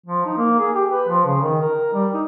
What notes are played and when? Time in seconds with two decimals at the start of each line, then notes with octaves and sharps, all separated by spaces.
0.06 F3
0.26 D#4
0.38 A#3
0.59 G#4
0.75 G4
0.90 B4
1.09 F3
1.26 C#3
1.42 D#3
1.62 A#4
1.94 G3
2.14 D#4